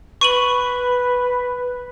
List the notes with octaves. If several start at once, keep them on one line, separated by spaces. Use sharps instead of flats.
B4 C#6 D#7 F#7